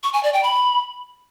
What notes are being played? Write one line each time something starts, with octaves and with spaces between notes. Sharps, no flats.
C#6
G#5
D5
G5
B5